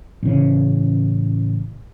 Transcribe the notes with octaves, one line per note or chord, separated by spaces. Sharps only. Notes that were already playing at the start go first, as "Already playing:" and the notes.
A1 C#3